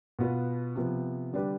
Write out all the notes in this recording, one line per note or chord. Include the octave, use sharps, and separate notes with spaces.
B2 B3 F4 B4
C3 F3 B3
D3 G3 D4 G4 B4